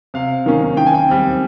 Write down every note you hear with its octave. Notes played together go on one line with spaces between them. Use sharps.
C3 F5
D#3 A#3 C#4
D#3 G5
G#5
G5
G3 C4